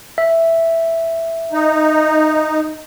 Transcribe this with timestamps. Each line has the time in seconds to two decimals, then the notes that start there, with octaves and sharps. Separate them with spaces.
0.18 E5
1.52 D#4